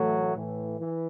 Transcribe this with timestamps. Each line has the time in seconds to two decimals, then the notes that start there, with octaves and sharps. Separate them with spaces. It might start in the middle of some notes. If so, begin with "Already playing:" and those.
Already playing: A2 E3 F#3 A3
0.35 A2 E3
0.79 E3